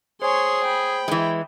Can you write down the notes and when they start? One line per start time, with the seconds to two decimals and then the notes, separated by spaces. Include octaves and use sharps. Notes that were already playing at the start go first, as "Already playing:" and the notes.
0.22 G#4 C5 C#5 G#5 C6
0.64 G5 B5
1.08 E3 G#3